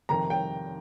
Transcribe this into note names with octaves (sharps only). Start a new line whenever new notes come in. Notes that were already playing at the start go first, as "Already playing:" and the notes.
F2 C3 D#3 A#5
G5